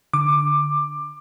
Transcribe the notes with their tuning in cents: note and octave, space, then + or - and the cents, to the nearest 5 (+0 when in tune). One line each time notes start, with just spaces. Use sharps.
D3 +0 D6 +15